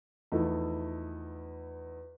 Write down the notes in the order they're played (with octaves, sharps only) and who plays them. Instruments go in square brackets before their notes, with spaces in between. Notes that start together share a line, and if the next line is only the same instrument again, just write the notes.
[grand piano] E2 F3 A3 D#4 E4